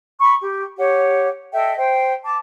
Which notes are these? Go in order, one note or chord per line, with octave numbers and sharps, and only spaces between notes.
B5 C#6
G4
G4 C#5 F#5
A4 D#5 E5 G5
C5 G5
A5 D6